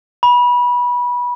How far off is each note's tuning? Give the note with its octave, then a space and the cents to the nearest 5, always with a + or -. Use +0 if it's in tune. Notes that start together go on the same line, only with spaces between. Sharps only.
B5 -20